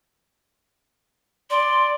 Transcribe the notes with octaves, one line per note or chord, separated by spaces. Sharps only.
D5 C6